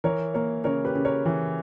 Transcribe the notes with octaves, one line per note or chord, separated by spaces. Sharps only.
E3 A#4 C#5
A#3 A#4 C#5
C#3 A#4 C#5
G4 B4
C#3
A#4 C#5
E3